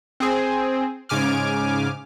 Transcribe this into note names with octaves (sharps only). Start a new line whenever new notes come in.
C4 G#4
G#2 C#3 G#5 D6 F6